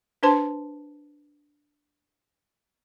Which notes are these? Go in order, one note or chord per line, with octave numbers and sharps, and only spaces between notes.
D4 B4 C5 A5 C6